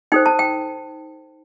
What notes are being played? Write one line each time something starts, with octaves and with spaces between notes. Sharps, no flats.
D#4 A4 C5 G5
A5
G5